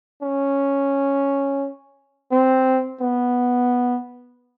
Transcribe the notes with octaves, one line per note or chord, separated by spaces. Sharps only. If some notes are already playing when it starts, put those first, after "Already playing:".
C#4
C4
B3